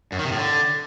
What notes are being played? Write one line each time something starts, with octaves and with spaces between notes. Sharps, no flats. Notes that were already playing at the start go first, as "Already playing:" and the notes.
F#2
D#3
C3
A2
D3